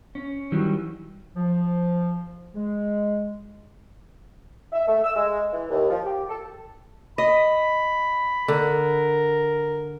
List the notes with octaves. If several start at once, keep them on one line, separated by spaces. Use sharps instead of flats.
C#4
D#3 E3 F#3 G3
F3
G#3
E5
A3
E6
G#3
E3
D#2
F3
G4
A4
D#5 B5
D3 A#4